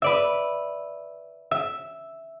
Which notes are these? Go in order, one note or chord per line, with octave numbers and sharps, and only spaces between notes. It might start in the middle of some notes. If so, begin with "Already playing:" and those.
B4 D5 E5
E5